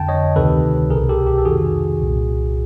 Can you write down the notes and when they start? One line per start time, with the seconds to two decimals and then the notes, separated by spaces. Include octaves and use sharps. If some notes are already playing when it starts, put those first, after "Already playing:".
Already playing: F2 D3 G5 A5
0.08 C#5 D#5
0.36 D2 C3 D#3 A4 B4
0.90 C2 B2 G#4 A#4
1.09 G4 A4
1.27 G4
1.38 A4
1.45 F2 C3 D#3 F#4 G#4
2.00 C2 A#2